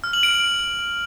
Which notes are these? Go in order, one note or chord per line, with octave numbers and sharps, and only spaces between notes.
F6
F#7
D7